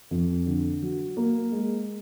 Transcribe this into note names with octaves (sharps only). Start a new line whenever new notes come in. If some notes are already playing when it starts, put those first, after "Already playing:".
F2
D3
F#3
A#3
G#3